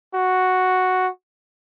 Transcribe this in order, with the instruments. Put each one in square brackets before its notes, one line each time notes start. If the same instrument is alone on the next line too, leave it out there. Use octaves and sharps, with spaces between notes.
[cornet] F#4